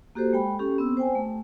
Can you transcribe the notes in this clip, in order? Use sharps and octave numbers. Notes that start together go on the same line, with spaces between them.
A#3 F#4 G4 A4 C5
G#3 G5 B5
C#4 G4 A4
B3 C4 E6
C5 G5 G#5
A3